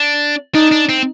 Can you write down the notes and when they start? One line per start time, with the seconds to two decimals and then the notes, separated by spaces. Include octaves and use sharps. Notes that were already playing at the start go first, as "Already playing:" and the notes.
Already playing: D4
0.55 D4 D#4
0.72 D4
0.89 C4